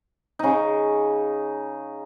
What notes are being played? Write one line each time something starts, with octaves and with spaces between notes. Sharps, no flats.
C#3 D#4